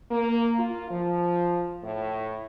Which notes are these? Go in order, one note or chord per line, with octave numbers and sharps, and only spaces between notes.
A#3
F4
F3
A2